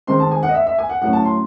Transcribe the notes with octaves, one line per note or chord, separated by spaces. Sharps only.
D#3 G#3 C4 D#4 C6
A5
G#5
F#5
D#5
E5
E5
G#5
F#5
A2 F#3 C#4 F#5
A5
C6